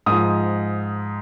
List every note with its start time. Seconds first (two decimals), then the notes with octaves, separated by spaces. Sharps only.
0.06 G#2 F3 D#6